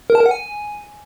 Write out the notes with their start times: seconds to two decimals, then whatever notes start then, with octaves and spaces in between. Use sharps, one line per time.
0.10 A#4
0.15 A5
0.20 A#4
0.26 F#5
0.31 G#5